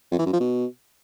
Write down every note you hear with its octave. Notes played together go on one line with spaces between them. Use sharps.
F2
E3
F#2
F3
B2